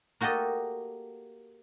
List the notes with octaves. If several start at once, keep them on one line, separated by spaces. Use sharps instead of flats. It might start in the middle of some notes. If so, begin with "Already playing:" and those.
A#3 F#4 G4 A4 D#5